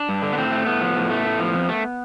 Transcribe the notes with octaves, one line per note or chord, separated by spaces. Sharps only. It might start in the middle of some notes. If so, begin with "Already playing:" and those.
Already playing: D4
G2
D3
B3
A2 C4
A3
A2 B3
F3
A2
A3
A2
F3
F2
A3